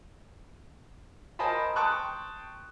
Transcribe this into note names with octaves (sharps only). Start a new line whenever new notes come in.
A#4 C5 D#5 G#5 A5 B5
G5 A5 C6 C#6 D#6 F#6